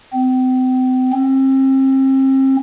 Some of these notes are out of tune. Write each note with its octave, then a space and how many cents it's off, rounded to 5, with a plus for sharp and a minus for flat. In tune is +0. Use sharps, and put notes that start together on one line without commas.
C4 -35
C4 +35